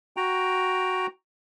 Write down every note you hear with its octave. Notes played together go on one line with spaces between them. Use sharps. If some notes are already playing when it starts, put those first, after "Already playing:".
F#4 G5 A#5